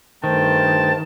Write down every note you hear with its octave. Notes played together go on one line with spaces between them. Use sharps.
G2 D#3 A3 C5 G5 A5